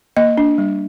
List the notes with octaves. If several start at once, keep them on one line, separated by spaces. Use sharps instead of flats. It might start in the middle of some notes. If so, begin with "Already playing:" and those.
A#3 D#5
D4
G3